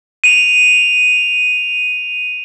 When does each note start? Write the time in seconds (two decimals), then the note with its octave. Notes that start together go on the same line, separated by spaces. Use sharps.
0.24 D#7 F7